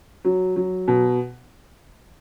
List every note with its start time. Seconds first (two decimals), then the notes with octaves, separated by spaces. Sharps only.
0.25 F#3
0.56 F#3
0.88 B2